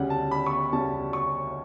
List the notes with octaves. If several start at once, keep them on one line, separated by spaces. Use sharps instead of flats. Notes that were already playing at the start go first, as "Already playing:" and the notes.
Already playing: D2 C#3 G3 C#4 F#5
A5
B5
C#6
B5
D2 C#3 G3 C#4 A5
C#6